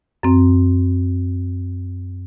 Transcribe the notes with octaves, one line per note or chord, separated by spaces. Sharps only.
F#2 C4